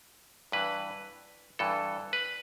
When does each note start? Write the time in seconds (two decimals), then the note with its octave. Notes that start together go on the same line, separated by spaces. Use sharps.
0.52 G2 E3 B4
1.59 G2 E3 A4
2.13 B4